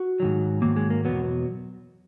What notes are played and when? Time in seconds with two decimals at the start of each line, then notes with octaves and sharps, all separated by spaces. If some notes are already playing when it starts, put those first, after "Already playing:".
Already playing: F#4
0.20 G#2 D#3 F#3
0.62 G#2 D#3 F#3 A#3
0.76 G#3
0.90 A#3
1.05 E2 B2 F#3 B3